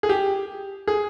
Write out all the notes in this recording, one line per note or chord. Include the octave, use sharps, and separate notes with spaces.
G#4
G4
G#4